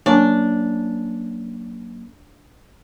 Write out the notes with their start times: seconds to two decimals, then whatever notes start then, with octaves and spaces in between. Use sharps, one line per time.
0.06 F#3 A#3 C#4 D4